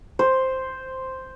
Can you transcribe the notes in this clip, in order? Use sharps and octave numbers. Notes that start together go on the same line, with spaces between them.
C5